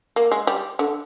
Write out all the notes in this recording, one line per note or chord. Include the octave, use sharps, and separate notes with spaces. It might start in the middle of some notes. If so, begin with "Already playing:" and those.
A#3
G#3
G3
D3